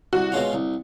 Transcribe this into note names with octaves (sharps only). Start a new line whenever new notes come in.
C2 F#4
B2 G#3 C#4 F4
C2